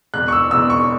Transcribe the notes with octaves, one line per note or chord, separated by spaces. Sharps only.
E1 E2 B2 F#6
C#6
E6
E1 E2 B2 E6
C#6